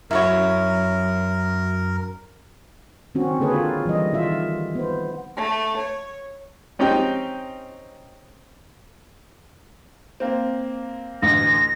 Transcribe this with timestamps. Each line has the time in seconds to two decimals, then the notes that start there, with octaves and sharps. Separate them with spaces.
0.11 F#2 E4 F#4 A#4 C#5
3.15 D#3 C4 C#4 F#4
3.40 D3 A#3 G#4 A4 B4 C#5
3.55 F4
3.86 E3 G3 D#5
4.13 D#3 F4 E5
4.75 B3 C5
5.37 A3
5.77 C#5
6.79 C4 C#4 D#4 G4 G5
10.20 A#3 C4
11.22 A1 D2 A#6